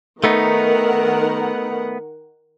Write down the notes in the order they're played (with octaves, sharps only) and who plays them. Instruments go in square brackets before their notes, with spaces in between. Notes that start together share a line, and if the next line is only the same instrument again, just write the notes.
[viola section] D#3 A#4 F#5 [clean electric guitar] A3 B3 D#4